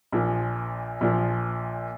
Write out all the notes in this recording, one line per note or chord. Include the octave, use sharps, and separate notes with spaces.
A#1 A#2 F3
A#1 A#2 F3